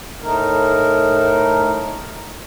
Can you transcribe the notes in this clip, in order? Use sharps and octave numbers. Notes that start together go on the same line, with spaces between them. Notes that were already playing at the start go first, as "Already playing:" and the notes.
A2 A3 D#4 A#4